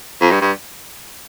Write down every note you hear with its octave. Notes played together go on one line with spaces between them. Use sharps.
F2
G2
G2